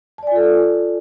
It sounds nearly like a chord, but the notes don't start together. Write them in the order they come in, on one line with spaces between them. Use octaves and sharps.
A5 D5 G#5 F4 A4